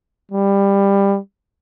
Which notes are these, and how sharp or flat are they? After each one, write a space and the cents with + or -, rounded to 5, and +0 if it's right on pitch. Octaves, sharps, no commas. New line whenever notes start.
G3 +15